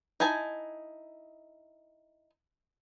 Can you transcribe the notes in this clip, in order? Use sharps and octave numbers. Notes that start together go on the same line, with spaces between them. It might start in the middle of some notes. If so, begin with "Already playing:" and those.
D#4 E4 G#5 A5